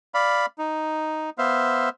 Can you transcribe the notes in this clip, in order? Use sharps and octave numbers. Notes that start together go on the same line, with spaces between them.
D5 F5 B5
D#4
B3 C5 E5 F5